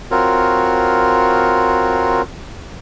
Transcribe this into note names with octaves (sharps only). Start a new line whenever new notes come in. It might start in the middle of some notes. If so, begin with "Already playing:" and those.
C4 F4 F#4 A#4 C#5